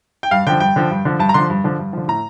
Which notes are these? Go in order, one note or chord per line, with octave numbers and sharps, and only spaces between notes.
G5
G2 F5
D3 F3 G5
G2 G5
D3 F3
G2
D3 F3
G2 A5
A#5
D3 F3 C6
G2
D3 F3
G2
D3 F3
A2 A#5